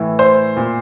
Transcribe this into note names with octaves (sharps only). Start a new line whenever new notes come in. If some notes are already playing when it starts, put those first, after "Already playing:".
Already playing: A2 E3
C5
A#2